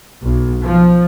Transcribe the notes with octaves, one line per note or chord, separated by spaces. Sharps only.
B1
F3